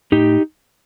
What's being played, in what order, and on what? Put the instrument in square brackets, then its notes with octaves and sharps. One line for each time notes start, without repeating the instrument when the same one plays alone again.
[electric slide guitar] A2 D#4 G4